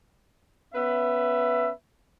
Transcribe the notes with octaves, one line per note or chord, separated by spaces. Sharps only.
B3 C#4 B4 E5